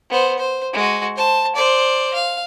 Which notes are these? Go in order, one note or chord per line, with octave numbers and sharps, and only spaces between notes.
B3 C5
C5
G#3 F#4
C5 A5
C5 D5
F5